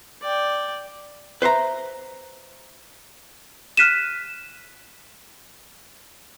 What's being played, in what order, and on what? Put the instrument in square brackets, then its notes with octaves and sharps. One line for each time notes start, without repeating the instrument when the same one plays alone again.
[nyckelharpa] D5 G5
[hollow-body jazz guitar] B4 C5 E5 A#5
[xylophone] F6 F#6 B6 D#7 E7